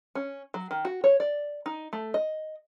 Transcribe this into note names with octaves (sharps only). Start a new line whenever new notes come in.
C#4
F#3
D#3
F#4
C#5
D5
D#4
A3
D#5